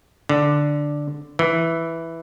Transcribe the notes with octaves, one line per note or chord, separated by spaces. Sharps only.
D3
E3